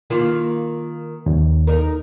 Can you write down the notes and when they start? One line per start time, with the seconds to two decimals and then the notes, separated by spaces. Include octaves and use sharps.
0.10 D#3 A#3 F4
1.26 D#2
1.67 D#4 A#4